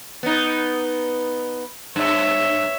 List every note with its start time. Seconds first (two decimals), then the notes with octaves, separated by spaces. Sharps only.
0.23 B3 D#4
1.96 G2 C#5 E5